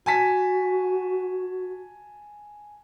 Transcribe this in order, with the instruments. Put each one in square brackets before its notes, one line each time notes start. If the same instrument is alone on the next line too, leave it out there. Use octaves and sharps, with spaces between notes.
[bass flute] F#4 [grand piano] G#5 A5 B6